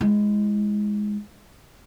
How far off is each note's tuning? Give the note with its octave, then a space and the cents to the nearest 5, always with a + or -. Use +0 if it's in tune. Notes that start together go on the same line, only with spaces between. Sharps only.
G#3 +0 E4 +0